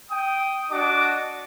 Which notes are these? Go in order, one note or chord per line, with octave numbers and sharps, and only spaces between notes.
G5 D#6
D4 F#4 D#5 D6